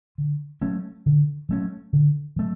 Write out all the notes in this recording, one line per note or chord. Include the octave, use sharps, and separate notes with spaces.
D3
F#3 A3 C#4
D3
F#3 A3 C#4
D3
F#3 A3